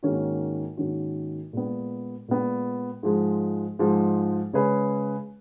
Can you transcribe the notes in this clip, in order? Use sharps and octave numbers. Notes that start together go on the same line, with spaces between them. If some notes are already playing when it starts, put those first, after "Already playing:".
G#2 D#3 A#3 C#4 F#4
G#2 D#3 A#3 C#4 F#4
A#2 G#3 B3
A#2 G#3 B3
G#2 F3 G#3
G#2 F3 G#3
C#3 G#3 C#4 G#4 B4